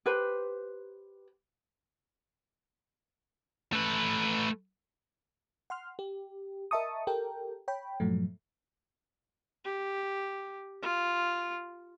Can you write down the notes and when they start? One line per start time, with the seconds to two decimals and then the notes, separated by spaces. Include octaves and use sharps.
0.06 G4 B4 C5
3.73 A3 B4
5.70 F#5 C6 F6
5.99 G4
6.71 A#4 D#5 E5 A5 C#6 D#6
7.07 G4 A4 A#4 G5
7.68 C#5 G5 B5
8.00 G2 A#2 F3 F#3 A3
9.65 G4
10.83 F4